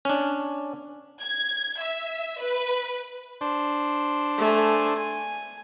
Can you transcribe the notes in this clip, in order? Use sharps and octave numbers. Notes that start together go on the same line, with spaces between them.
C#4 D4
G#6
E5
B4
D4 C5
A3 G#5
G#5